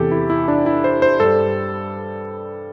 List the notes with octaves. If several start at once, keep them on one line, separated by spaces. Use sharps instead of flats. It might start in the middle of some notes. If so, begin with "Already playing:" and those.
Already playing: E2 C3 E3 G4 A4
E4
E4
D4
E4
C5
C5
G2 G3 A4